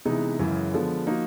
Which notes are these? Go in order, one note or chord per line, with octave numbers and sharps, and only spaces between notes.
C3 E3 G#3 B3 D#4
F#2 C#3 E3 G#3
D3 F3 G#3 B3
F3 A#3 D#4 F#4